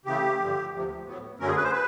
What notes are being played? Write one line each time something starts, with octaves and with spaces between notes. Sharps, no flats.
C#3 E3 A3 G4
G2 D3 F3
D2 C3 F3
A2 F#3 B3
F#2 D3 F#3 A3 C#4 A#4
G#4
B4
C5
B4